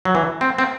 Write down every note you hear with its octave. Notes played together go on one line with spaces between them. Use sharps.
F#3
E3
C4
C4